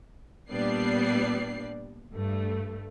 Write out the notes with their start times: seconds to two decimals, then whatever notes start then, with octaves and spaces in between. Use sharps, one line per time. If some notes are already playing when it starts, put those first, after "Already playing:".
0.50 A#2 G3 B3 D4 D5 C7
2.12 G2 A3